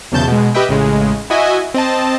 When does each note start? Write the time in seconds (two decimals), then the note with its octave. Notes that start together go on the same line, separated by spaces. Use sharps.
0.12 B1 E2 C#3 A5 G6
0.28 B2 G#3
0.54 G4 B4 D#5 E5 G5
0.69 A1 C#3 G#3
1.30 E4 F#4 D#5 E5 G#5
1.74 C4 D#5 A5